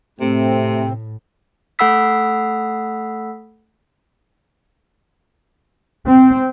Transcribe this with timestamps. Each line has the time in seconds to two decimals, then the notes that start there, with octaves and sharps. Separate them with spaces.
0.21 A2 C3 A3 C4
1.79 A3 A4 F#5 B5 E6 B6
6.07 C4